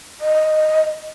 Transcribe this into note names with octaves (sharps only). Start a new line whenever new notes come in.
D#5